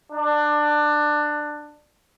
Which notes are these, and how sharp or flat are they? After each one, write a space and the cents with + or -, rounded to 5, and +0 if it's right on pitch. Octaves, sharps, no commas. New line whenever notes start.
D4 +20